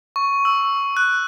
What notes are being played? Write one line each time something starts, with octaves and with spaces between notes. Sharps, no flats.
C#6
E6
F#6